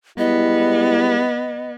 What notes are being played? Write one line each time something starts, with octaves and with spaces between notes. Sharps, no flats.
G3 G#3 B3 E4 D#5